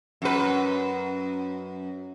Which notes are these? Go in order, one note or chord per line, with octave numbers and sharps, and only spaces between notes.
F#2 B4